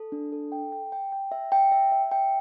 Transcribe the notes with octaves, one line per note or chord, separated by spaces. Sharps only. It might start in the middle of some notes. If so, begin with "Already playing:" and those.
Already playing: A4
D4
A4
G5
G5
G5
G5
E5
G5
E5
E5
G5